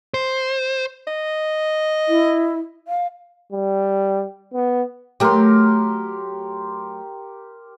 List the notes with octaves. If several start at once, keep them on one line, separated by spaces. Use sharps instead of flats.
C5
D#5
E4
F5
G3
B3
F#3 A3 G4 A#4 C6